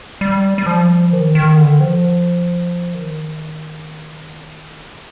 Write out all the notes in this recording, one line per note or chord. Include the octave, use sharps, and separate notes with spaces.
G3
G3
F3
D#3
D#3
D3
F3
D#3
C3
D3